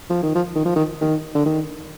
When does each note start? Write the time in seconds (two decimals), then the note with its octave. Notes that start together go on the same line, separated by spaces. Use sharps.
0.10 F3
0.23 D#3
0.35 F3
0.55 D#3
0.65 F3
0.76 D#3
1.01 D#3
1.35 D3
1.45 D#3